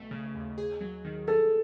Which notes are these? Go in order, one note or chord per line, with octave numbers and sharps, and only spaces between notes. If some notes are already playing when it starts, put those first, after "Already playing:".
Already playing: B1 A3
C#3
D#2
G#4
F#3
D#3
G#4 A4